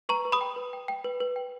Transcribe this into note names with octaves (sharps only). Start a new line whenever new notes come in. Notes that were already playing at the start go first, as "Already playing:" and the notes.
B4 A#5 C#6
B4
B5 D#6
G5
B4
G5
G5
B4
B4
G5